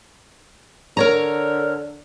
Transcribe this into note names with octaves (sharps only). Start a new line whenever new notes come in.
D3 A#4 C#5 A#5